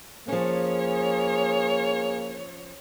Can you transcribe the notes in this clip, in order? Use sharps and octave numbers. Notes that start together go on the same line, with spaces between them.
F3 A#3 C#4 G#4 C#5